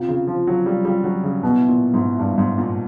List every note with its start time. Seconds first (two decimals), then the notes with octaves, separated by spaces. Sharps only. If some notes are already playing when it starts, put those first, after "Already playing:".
Already playing: C3 F4
0.08 C#3
0.27 F3
0.47 F#3
0.66 G3
0.85 G3
1.04 F#3
1.23 C#3
1.43 B2 E4
1.68 A#2
1.94 G#2
2.19 G2
2.38 G#2
2.58 A#2